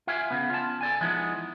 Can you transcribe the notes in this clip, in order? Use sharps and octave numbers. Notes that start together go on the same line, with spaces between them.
F4 E5 F5 G#5
C#3 B3
F4 A5
A4 D5 G#5
E3 F3 G#3 B3 D#4